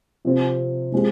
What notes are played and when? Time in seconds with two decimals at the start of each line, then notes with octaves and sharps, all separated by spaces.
0.25 C3 F3 C4
0.92 F3 G#3 C4 G4